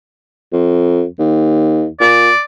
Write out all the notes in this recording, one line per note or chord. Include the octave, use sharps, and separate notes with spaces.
F2
D#2
A#2 D5